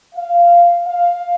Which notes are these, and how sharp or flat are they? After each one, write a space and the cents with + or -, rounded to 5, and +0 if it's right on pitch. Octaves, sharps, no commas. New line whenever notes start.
F5 -10
F5 +5